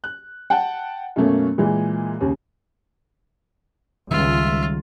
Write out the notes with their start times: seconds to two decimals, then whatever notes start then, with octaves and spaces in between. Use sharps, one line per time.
0.04 F#6
0.50 F#5 G5 A5
1.16 F#2 B2 A3 A#3 C#4
1.58 A#2 E3 G#3
2.21 D#2 C#3
4.11 C#2 D#3 G3 F4 E5